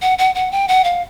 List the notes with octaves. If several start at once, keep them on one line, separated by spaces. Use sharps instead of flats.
F#5
F#5
F#5
G5
F#5
F5